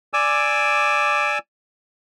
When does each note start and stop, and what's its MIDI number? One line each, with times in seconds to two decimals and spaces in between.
0.13 1.38 74
0.13 1.38 80
0.13 1.38 86
0.13 1.38 88